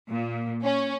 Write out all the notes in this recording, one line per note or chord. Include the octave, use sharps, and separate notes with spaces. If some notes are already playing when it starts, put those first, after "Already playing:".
A#2
C#4